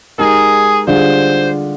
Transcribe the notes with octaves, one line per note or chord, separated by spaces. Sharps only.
G#3 D#4 G4 G#4 A#4
D3 G3 D4 F4 G#4 C5